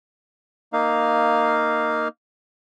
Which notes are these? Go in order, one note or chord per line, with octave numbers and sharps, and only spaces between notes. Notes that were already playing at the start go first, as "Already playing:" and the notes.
A#3 D#4 F5